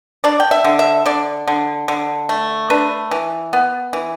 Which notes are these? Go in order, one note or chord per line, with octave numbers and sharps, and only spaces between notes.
D4 D5
G5
E5
D3
E5
D3 D5
D3
D3
A3
D4 B4
E3
B3
E3